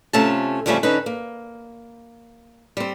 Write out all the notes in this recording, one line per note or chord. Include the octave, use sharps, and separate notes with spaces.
C3 A3 C#4 F4 A5
F2 C#3 F3 G3 A3 C#4
D3 C#4 D#4 B4
A#3
G3 C4